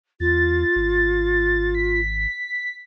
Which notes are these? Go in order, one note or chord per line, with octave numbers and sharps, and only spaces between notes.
E2 F4 A6
G#1
B6